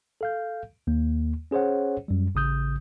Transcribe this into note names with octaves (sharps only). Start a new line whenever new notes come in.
A4 F5 G6
D#2 A#3
C#4 G#4 C5 C#5 F#5
F#2 G3
A1 C#3 D#6 G6